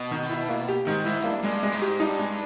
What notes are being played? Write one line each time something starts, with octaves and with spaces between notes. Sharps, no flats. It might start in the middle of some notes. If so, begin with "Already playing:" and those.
Already playing: B2
D#3
E4
A#3
G4
G#2 D#3
G#2 E4
G#2
G2 A#3
G2 G#3
G#3
G#2
G4
G2 D#4
G#3